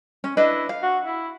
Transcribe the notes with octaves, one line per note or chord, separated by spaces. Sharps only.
C#4
D4 E4 B4 D#5
F5
F#4
E4